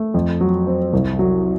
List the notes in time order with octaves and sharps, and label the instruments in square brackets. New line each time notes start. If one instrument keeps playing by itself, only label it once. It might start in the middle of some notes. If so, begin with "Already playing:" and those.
Already playing: [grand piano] A3
F2
F#3
C4
C2
F#3